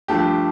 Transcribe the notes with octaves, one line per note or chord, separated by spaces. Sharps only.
G2 F3 A3 G4